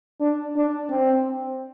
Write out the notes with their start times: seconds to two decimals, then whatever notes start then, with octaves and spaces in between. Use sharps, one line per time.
0.20 D4
0.55 D4
0.89 C4